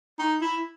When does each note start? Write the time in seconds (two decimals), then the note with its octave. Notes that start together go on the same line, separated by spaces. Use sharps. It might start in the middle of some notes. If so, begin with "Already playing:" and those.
0.19 D#4
0.41 E4